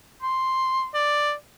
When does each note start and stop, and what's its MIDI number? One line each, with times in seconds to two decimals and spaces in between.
0.22 0.87 84
0.94 1.33 74